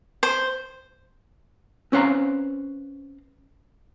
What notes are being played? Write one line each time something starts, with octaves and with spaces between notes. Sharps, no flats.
C5
C4 C#4 B4 C5 F5 A#5